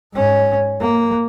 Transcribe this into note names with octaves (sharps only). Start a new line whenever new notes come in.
G#2 C#4
A#3